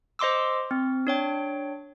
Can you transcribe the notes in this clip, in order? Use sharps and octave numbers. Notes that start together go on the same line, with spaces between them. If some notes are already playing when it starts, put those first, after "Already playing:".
C5 D#5 C6 D6 E6
C4
D4 C#5 G5